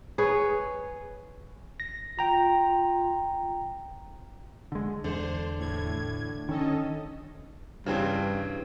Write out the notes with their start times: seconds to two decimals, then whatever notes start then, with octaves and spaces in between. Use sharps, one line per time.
0.18 G#4 B4 C#5
1.80 A#6
2.19 F4 G5 A#5
4.72 D3 G#3
5.04 E2 D3 C5
5.59 A2 G#6
6.49 D#3 C#4 A4 D#5
7.86 G2 C#3 E3 C4